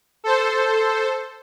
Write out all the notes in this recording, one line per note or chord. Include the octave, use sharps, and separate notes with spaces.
A4 C5